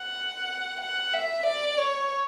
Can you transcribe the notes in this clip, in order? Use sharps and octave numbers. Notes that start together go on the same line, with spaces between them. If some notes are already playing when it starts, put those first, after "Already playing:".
Already playing: F#5
F#5
E5
D5
C#5